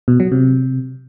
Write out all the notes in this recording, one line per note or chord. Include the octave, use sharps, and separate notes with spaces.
B2
F#3
C3